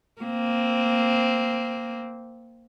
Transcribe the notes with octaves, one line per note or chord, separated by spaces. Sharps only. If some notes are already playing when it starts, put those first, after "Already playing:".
A#3 C4